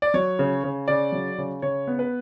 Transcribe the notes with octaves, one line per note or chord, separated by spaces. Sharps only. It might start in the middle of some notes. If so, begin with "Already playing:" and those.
D5
F#3 C#5
C#3
C#3
C#3 D5
F#3
C#3
C#3 C#5
B3
B4